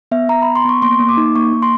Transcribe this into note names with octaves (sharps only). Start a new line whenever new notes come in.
B3 E5
B3 A#5
B3 B5
C6
B3 C#6
A#3 C6
A#3
D6
D#4
A#3 C#6
A#3
C6